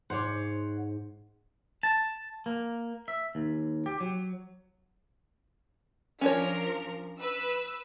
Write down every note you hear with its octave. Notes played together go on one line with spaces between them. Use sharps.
G#2 C5 C#5 F#5 D6
A5
A#3
E5
D#2
G4
F#3
F3 C#4 D4 A#4 C#5
B4 E6